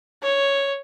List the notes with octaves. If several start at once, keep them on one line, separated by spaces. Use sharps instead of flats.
C#5